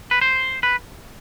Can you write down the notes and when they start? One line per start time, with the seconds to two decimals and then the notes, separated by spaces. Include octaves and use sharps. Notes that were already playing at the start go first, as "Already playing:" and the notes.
0.11 B4
0.21 C5
0.63 B4